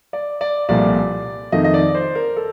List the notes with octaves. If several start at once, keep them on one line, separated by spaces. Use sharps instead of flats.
D5
D5
C2 A#2 F3 A3 D5
F2 D#3 A3 D#5
D#5
D5
C5
A#4
A4